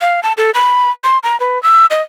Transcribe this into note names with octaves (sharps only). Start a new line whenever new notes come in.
F5
A5
A4
B5
C6
A#5
B4
E6
D#5